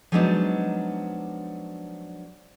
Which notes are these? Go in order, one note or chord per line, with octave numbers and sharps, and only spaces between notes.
F3 F#3 G#3 B3 D4 D#4